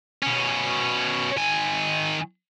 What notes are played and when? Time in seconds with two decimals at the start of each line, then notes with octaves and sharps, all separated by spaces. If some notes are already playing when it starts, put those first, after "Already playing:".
0.23 B2 C#4
1.37 D#3 G#5